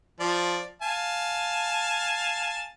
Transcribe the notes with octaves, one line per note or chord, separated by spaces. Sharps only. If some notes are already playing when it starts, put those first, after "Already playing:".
F3 D5
F5 G#5 A5